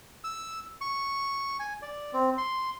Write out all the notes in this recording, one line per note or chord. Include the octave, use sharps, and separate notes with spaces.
E6
C#6
G#5
D5
C4
C6